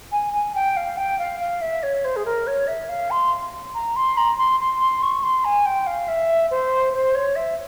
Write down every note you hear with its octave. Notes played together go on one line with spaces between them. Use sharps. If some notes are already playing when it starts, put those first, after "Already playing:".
G#5
G#5
G5
F5
G5
F5
F5
E5
C#5
C5
G#4
A#4
C#5
E5
F5
C6
A#5
C6
A#5
C6
C6
C6
C#6
C6
G#5
G5
F5
E5
C5
C5
C#5
E5